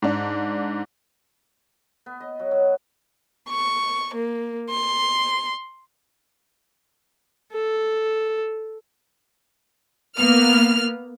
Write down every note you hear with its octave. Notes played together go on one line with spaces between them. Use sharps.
G#2 D4
B3
D#5
F#3
F#3
C#6
A#3
C6
A4
A#3 B3 F6